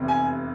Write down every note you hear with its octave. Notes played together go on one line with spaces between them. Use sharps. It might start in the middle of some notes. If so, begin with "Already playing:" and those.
Already playing: F1 E2 C3
G#5